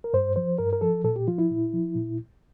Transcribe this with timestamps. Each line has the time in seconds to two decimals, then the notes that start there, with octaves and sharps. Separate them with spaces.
0.04 A#4
0.13 G2 C5
0.36 F3 C5
0.59 G2 A#4
0.73 A#4
0.81 F3 A4
1.04 A#2 A4
1.16 G4
1.28 F3 F4
1.38 E4
1.51 A#2
1.73 F3
1.95 A#2